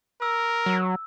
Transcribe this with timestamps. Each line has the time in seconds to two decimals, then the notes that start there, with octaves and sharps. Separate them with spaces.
0.22 A#4 E6
0.66 F#3